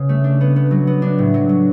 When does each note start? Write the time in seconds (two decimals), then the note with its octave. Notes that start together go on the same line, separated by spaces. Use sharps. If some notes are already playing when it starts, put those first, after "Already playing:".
Already playing: C#3 B3
0.09 A3
0.24 D4
0.41 B3
0.56 B3
0.71 F#3
0.87 B3
1.02 D4
1.19 A2
1.34 F#3
1.49 F#3